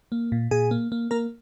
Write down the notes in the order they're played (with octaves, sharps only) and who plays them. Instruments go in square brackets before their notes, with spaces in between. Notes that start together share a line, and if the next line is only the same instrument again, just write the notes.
[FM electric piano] A#3
A#2
A#2 G#4 G#5
A#3
A#3
A#3 A#4 A#5